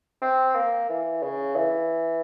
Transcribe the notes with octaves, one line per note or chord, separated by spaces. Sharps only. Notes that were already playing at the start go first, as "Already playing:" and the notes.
C4
A#3
E3
C#3
E3